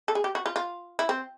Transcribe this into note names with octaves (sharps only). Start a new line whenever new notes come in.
A4
G#4
G4
F#4
F4
F4
E4
C4